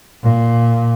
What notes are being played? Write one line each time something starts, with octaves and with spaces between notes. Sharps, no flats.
A#2